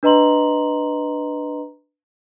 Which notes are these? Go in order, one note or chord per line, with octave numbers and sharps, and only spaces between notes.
D4 B4 D#5 A#5 C6 F#7